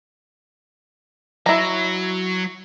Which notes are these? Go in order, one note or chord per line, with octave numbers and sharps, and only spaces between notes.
F#3 E4 A#5